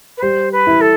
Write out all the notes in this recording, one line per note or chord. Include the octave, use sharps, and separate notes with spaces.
B4
G3 C5
B4
E4
A4